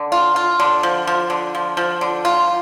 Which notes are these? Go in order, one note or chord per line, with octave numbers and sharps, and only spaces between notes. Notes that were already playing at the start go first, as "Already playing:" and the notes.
Already playing: D3
F4
F4
D3
F3
F3
D3
F3
F3
D3
F4